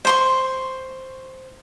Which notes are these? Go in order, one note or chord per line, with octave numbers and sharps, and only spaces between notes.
C5 C6 C#6